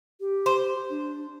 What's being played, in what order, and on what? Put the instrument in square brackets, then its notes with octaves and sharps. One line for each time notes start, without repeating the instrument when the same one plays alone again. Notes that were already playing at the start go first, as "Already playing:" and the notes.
[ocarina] G4
[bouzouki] C5
[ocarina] D4